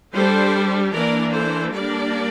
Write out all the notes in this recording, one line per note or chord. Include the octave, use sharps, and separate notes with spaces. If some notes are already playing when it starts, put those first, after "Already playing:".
G3 D4 A4 C5
E3 A#3 D4 A#4 D5
A4 C5
G3 A#3 D4 A#4 D5